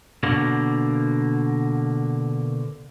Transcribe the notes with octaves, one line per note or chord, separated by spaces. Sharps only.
B2 D3 A#3